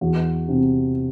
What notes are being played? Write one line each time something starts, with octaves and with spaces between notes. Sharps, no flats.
E2 F#4
C3